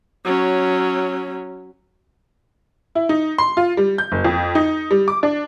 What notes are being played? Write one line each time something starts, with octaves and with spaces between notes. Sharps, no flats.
F#3 C#4
E4
D#4
C6
F4
G3
G6
F#1
F2
D#4
G3
D6
D4